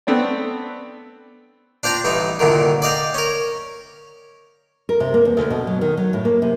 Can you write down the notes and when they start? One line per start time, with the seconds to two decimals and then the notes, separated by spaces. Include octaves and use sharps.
0.07 A3 B3 C4 D4 D5
1.83 D4 F4 C5 G5 A#5
2.04 A1 G2 G3 D#4
2.39 C2 A#2 D3 D#3
2.82 D5 D#5 F5 G5
3.14 C#4 A#4
4.89 A#4
5.00 C3
5.14 A#3
5.25 E2
5.37 D2
5.50 B2
5.67 F#3
5.81 D#3
5.97 F#3
6.13 A2
6.25 A#3
6.42 C3